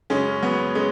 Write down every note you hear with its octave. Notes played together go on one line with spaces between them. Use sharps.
F#2 C#3 G#3 C#4
F#3 B3
G#3 C#4